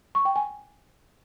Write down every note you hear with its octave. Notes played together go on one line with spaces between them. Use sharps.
C#6
G5
G#5